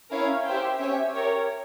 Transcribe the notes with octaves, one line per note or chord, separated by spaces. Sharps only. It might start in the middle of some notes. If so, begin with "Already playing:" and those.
C#4 E4 A#4 C#5 F5
G4 C5 E5 G5
C#4 G4 C#5 E5
G4 A#4 C#5